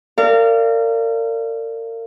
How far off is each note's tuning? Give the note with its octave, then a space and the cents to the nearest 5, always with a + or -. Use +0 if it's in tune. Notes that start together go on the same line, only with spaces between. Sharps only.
A#4 -35 D5 +0 F5 -20